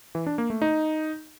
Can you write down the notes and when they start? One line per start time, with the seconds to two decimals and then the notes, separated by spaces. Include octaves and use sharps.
0.15 E3
0.26 D4
0.38 A#3
0.50 A3
0.62 D#4